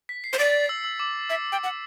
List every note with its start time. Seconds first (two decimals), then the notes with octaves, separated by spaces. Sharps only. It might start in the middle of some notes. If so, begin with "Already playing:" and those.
0.09 B6
0.24 C7
0.33 C5
0.39 D5 A6
0.69 E6
0.84 E6
1.00 D6
1.29 E5 E6
1.52 G5
1.63 F#5